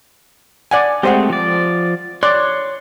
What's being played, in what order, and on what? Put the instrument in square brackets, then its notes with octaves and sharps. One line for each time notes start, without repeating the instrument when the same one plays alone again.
[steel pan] D5 F#5 G#5
[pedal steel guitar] G#3 A3 C4 [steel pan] G4 C5 F#5
[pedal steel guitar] F3 D5
[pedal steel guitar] C#5 C6 F#6 [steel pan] D5